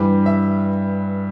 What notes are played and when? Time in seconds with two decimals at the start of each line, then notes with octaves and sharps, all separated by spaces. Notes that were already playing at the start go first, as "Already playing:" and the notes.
Already playing: G2 E3 G3 B4
0.26 E5